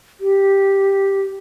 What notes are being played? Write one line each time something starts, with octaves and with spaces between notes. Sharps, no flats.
G4